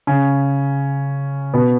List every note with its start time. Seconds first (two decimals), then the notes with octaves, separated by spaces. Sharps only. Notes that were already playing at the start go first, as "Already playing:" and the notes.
0.07 C#3 C#4
1.54 B2 B3